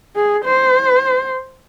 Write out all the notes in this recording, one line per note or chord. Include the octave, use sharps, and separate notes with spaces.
G#4
C5